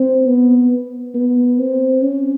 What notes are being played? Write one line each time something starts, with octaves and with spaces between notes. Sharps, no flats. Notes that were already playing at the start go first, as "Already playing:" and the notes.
Already playing: C4
B3
B3
C4
C#4